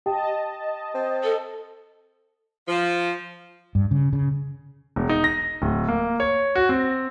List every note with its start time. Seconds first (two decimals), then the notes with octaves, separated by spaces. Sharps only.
0.06 G4 D#5 G5 A5
0.95 C4
1.23 A4
2.69 F3
3.75 G2
3.91 C#3
4.13 C#3
4.96 E1
5.09 D#4
5.24 A#6
5.62 D1
5.88 A#3
6.20 C#5
6.55 F#4
6.69 C4